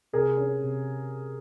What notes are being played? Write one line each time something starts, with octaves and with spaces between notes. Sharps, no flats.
C3 G#4 A#4
C#4
C3